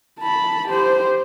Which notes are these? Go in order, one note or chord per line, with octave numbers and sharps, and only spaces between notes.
A5 B5
G4 C5